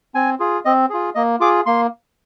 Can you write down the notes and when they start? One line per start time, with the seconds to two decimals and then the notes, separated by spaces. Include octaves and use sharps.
0.15 C4 G#5
0.40 F4 G#4
0.65 C4 D#5
0.90 F4 G#4
1.15 A#3 D#5
1.40 F4 G#4 D6
1.66 A#3 C6